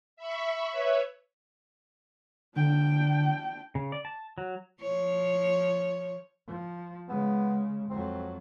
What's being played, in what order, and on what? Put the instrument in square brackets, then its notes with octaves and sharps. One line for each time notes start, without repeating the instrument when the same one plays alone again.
[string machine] E5 B5 C#6
B4 C#5 E5
[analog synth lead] D3 [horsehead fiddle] D4 G5
[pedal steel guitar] C#3
D5
A5
F#3
[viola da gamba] F3 C#5
[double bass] F3
[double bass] C#3 G#3 [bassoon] B3
[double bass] F2 F#3 [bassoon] C4